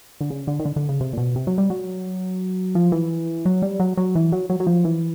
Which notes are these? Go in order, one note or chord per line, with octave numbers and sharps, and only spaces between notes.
D3
C#3
D3
D#3
D3
D3
C#3
C3
A#2
B2
C3
F#3
G3
F#3
F3
E3
F#3
G3
F#3
F#3
E3
F#3
F#3
F#3
F3
E3